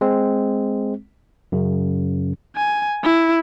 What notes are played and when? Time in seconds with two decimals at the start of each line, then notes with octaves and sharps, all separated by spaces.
0.01 G#3 C4
1.52 F#2 C#3
2.56 G#5
3.03 E4